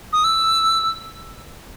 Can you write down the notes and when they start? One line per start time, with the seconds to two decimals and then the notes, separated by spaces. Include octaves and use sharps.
0.13 D#6
0.24 E6